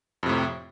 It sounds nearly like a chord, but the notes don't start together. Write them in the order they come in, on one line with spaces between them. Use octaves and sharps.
F2 C3 A2